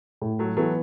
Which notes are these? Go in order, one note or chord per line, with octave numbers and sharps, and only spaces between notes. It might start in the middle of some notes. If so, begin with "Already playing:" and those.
A2
F#3 A3
E3 F#3 A3 B3